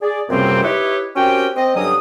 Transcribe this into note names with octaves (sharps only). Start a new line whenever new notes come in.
G#4 D5
C#2 F#2 C3 G3 A#3 C4
D#4 E4 G4 B4 C#5
C4 C#4 F#4 G4 A#4 G5
C4 D#5
G2 D3 F#3 C#4 D#6